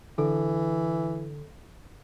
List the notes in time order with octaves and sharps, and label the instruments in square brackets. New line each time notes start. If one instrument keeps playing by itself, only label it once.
[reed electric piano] D3 [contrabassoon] E3 [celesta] A4